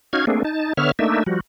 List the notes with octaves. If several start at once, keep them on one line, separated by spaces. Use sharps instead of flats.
C#4 D#4 F#4 F5 G#6
A3 A#3 C4 D4 G#4
D#4 A5
D3 B3 C#5 E5 F6
A3 A#3 D4 D#4 E5
F3 G3 F#4